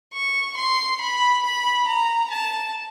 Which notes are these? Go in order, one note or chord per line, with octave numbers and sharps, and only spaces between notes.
C#6
C6
B5
B5
A#5
A5